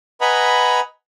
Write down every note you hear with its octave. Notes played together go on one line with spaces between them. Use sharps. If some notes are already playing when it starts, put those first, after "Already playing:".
B4 D#5 F#5 G#5 A#5 B5